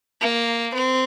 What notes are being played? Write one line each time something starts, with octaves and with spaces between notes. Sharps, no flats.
A#3
C4